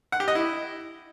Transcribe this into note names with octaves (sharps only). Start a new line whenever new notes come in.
F#5
G4
D#5
E4